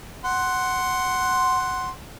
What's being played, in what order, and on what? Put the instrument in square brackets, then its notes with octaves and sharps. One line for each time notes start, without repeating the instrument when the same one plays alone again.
[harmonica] F#5 C6